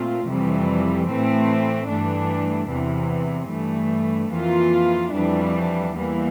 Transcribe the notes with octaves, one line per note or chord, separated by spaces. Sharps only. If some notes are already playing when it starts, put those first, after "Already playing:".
Already playing: A#2 A3 C4 F4
F2 C3 E3 G3
A2 E3 A3 C4
G2 E3 A3 D4
E2 C3 E3
G2 E3 A3
F2 E3 A#3 F4
F2 E3 G3 D4
E2 E3 G3 A#3